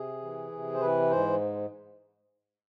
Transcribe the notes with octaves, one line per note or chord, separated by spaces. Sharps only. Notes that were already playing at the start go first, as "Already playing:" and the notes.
Already playing: C3 G#4
E3
C3
C5
E3 B4
G#2 C5